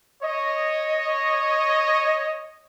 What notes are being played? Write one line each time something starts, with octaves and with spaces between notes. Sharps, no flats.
C#5 D#5